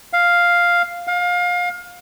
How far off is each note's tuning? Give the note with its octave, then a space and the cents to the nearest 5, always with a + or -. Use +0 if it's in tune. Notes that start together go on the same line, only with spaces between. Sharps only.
F5 +0
F5 +25